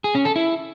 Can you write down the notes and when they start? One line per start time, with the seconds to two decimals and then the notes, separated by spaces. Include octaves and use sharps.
0.04 G#4
0.15 C#4
0.25 A4
0.36 E4